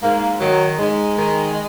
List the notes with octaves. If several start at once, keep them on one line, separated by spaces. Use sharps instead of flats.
G#2 A#3
D#3 F#3
G#2 G#3
D#3